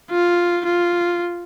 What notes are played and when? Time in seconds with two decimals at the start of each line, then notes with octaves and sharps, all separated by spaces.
0.11 F4
0.65 F4